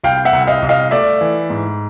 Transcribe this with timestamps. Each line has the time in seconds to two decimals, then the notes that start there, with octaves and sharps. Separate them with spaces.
0.03 C2 F5 G5
0.25 E5 F#5
0.33 C2
0.48 D#5 F5
0.62 C2
0.69 D#5 F5
0.91 A3 D5 E5
1.21 E3
1.50 G#2